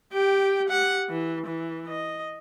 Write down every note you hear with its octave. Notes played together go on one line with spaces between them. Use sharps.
G4 G5
G4 F#5
E3
E3
D#5